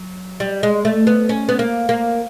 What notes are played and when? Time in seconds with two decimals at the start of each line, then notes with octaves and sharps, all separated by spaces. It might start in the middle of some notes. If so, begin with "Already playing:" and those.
Already playing: F#3
0.40 G3
0.63 G#3
0.85 A3
1.07 B3
1.29 C#4
1.49 B3
1.59 A#3
1.89 A#3